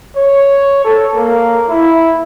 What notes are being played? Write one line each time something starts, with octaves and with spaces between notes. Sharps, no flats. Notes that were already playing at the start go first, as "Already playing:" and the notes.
C#5
A4
A#3
E4